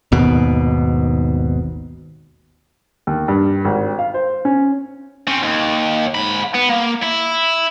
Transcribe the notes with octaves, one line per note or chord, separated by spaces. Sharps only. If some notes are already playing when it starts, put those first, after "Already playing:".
G#1 D#2 B2
D#2
G2
G#1
F5
C5
C#4
C4 C#4
D#2
G#2 B5
B3
A#3
E4